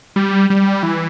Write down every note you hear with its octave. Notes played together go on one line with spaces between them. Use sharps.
G3
G3
E3